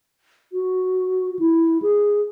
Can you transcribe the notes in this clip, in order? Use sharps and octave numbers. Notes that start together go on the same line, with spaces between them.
F#4
E4
G#4